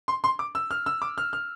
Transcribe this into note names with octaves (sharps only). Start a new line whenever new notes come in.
C6
C6
D6
E6
F6
E6
D6
F6
F6